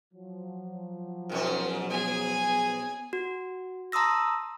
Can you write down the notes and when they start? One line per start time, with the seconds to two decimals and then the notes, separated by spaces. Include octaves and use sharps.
0.14 F3 F#3
1.29 G#2 B2 C#4 A#4
1.90 B3 G#4 G#5
3.13 F#4
3.92 A5 A#5 C6 D#6 E6 A#6